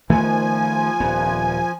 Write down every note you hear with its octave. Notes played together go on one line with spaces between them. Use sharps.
D#3 F3 A3 B3 G#5
D#1 B3